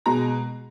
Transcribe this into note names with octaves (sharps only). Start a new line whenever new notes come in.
B2 G#3 A#5